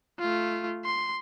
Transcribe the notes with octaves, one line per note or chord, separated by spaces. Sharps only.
A3 F4
C6